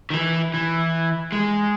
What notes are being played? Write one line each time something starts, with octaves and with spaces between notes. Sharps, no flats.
D#3
E3
E3
G#3